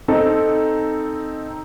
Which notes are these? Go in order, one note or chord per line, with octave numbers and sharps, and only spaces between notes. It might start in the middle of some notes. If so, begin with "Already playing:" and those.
C4 D#4 A4